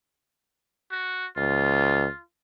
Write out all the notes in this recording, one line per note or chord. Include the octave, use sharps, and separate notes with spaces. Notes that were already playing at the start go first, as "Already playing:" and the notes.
F#4
C#2 F4